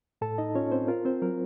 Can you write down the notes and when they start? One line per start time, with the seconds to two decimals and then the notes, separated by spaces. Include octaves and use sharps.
0.21 A2 A4 A5
0.38 D#4 D#5
0.55 C#4 F4 C#5
0.72 C4 C5
0.88 F4 A#4
1.05 C4 C5
1.22 F#3 A#4